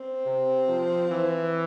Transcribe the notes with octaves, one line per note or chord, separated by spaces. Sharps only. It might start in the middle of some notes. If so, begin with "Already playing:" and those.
Already playing: C4
C3
F3
E3